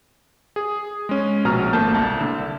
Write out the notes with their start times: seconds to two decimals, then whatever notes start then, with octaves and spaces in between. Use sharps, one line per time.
0.56 G#4
1.09 G#3 C#4
1.45 A#1 B2 A#5 F6
1.73 G#1 A3 A#3 A5 G6
1.94 C2 A5
2.21 D3